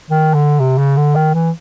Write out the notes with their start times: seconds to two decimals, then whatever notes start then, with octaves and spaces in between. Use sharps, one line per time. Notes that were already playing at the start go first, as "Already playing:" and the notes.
0.10 D#3
0.34 D3
0.59 C3
0.78 C#3
0.96 D3
1.15 D#3
1.34 E3